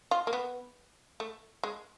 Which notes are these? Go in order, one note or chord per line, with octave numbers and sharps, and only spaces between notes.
F4
A#3
B3
A3
G#3